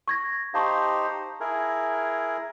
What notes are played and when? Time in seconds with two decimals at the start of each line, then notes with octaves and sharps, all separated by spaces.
0.08 C#6 G#6 A#6
0.54 D#4 G4 C5 F5 A5 C#6
1.40 E4 G#4 A#4